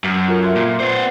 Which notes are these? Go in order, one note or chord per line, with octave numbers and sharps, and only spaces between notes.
F#2
F4 A4 A#4
E5 C6 G#6
A#2
B3 C5 D5 F#5